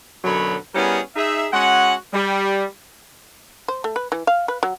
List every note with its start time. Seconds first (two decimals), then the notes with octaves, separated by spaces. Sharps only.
0.24 F#2 B2 D3 F#3 C#5 B5
0.74 G3 B3 C#4 E4 G#4 A#4
1.16 D#4 G#4 E5
1.52 G#3 C#4 F#4 F#5
2.13 G3
3.68 C5
3.84 A3
3.96 B4
4.12 E3
4.27 F5
4.48 B4
4.63 F#3